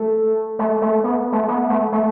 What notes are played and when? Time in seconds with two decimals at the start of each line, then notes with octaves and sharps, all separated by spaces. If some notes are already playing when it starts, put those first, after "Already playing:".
Already playing: A3
0.59 A3
0.82 A3
1.04 B3
1.32 A3
1.48 B3
1.70 A3
1.92 A3